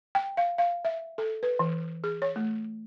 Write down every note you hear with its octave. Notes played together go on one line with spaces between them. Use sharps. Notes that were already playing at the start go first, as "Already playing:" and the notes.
G5
F5
F5
E5
A4
B4
E3
G#4
C#5
A3